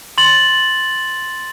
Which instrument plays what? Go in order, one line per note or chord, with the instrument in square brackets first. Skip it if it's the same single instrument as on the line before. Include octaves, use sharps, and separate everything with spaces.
[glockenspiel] C6 A6 F#7